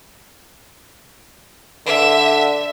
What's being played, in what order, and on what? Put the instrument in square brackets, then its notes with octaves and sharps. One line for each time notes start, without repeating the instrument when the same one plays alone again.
[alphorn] D3 [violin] E5